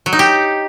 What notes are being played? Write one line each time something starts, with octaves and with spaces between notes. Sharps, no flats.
F#3
D#4
G4